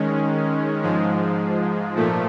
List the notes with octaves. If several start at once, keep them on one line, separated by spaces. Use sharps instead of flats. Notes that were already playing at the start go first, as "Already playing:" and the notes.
Already playing: D#3 G#3 C#4
G#2 F3 G#3
A#2 F3 A3